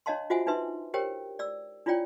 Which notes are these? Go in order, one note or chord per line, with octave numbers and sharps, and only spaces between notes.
D4 C#5 D#5 F5 A5 C6
F4 F#4 C5 E5 F#5 G#5
D4 D#4 B4 E5 C6
G4 A#4 C5 C#5 G5
D5 E6
D4 E4 F4 C#5 D5 G5